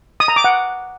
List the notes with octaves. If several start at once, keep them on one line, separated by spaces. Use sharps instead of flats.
D#6
A#5
D6
F#5